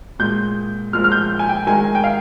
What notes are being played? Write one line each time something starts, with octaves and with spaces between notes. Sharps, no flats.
A#2 G#3 G6
A#2 F3 G#3 F6
F6
G6
G#5
G5
D#3 G#3 G#5
G5
F5